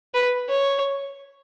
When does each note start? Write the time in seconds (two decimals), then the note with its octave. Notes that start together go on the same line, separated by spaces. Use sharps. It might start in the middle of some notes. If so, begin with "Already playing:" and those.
0.14 B4
0.49 C#5